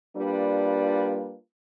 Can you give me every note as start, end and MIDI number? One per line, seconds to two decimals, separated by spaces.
0.17 1.35 55
0.17 1.35 58
0.17 1.35 62
0.17 1.35 65
0.17 1.35 71